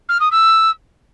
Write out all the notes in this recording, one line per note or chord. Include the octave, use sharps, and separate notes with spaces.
F6
D#6
E6